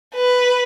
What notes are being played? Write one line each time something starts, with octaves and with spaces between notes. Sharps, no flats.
B4